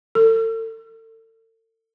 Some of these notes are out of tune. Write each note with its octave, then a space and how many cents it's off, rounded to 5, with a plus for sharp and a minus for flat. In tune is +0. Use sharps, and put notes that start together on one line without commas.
A4 +40